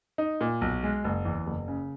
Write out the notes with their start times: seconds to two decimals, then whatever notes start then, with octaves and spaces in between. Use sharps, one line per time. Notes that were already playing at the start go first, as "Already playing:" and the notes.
0.18 D#4
0.41 A#2
0.61 B1
0.83 G#3
1.04 F#1
1.25 E2
1.47 F#1
1.68 C#3